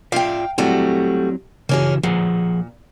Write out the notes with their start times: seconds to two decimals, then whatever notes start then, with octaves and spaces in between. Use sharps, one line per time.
0.12 F4 D5 E5 F5 G5
0.58 F#3 G3 A3 C4 E4 F#4
1.69 C#3 E3 A#3 C#4 F#4 G#4
2.03 A#2 F3 G#4 F#5